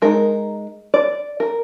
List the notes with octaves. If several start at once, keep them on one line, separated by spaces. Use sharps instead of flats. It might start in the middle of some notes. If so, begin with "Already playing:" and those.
G#3 D#4 A#4
D5
A#4